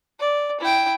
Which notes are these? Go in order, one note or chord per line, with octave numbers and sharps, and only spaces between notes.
D5
E4 G5